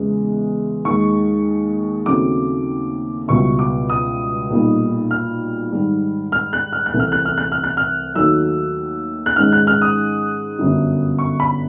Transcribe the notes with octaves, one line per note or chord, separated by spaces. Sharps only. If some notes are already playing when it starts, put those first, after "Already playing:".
Already playing: E2 C#3 E3 G#3
D#2 D#3 G#3 C#6
D#2 C#3 F#3 A3 C4 D6
C#2 B2 G3 B3 E4 C#6
D6
D#6
B1 A#2 G3 A#3 D#4
F6
G#2 D#3 G3
F6
F#6
F6
F#6
C2 C3 E3 A3
F6
F#6
F6
F#6
F6
F#6
F6
D#2 D#3 F#3 A3 E6
F#6
G#2 D#3 G#3 C#4 F6
F#6
F6
D#6
G1 F#2 D3 G3
C#6
B5